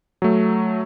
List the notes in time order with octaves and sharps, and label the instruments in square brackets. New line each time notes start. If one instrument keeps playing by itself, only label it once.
[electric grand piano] F#3 A3